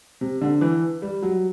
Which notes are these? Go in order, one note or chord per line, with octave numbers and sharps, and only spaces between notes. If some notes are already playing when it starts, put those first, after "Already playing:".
C3
D3
E3
G3
F#3